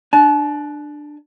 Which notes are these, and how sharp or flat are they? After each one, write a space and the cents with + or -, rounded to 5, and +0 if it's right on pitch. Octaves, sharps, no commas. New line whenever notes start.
D4 +15 A5 -45